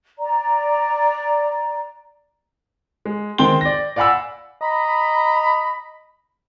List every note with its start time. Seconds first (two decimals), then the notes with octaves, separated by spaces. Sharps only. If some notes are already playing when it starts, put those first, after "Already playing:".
0.19 D5 A#5
3.05 G#3
3.38 D#3 G#3 C4 G5 C6 G7
3.61 D5 A#6
3.96 D5 F5 F#5 G#5 B5 E6
4.61 D#5 A#5 B5